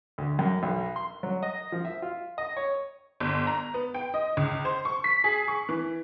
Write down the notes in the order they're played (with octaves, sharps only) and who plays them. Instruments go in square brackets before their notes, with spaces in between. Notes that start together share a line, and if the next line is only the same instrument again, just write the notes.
[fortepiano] D2
F#2
B1
C6
F#3
D#5
F3
E5
F4
D#5
C#5
[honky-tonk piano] G1
A#5
B3
G5
D#5
C#2
C5
C#6
B6
G#4
C#6
E3